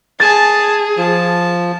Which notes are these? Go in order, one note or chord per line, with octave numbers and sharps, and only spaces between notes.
G#4 G#5 A5 A6
F3 A5